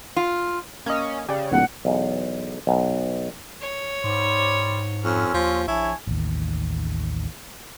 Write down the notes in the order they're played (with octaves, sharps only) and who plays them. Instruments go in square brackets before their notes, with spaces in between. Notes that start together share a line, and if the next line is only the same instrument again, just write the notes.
[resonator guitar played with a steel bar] F4
[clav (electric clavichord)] A#3 D#5 [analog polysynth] C#4
[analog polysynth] C#3 [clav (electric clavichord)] G4 D5
[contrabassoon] D1 [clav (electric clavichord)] A#2 [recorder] F#5
[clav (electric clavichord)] B1 E2
B1
[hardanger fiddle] C#5
[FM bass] G#2 [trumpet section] G3 C5 D5
[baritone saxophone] F2 [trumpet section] C4 C#4
[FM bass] D#2 [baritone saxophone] F3
[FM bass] A#1 [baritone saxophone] E4 [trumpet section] C#5 G#5 A5
[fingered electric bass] A1 D#2